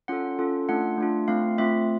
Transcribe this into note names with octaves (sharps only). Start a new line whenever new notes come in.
C#4 F4 A4 F#5
C#4 F4 A4
A3 D4 F4 F#5
A3 D4 F4
A3 C4 F4 F5
A3 C4 F4 E5